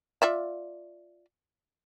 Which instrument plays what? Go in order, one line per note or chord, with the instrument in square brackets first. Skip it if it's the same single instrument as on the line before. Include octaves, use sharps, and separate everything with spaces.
[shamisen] F4 D5 E5